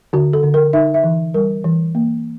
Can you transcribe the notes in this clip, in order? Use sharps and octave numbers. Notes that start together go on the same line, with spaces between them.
D3 F#4
A4
D3
A#4
D#4 E5
E5
E3
G3 A#4
E3
A#3